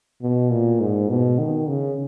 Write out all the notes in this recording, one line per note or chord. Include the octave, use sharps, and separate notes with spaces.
B2
A#2
G#2
B2
D#3
C#3